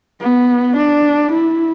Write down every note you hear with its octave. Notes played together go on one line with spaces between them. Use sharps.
B3
D4
E4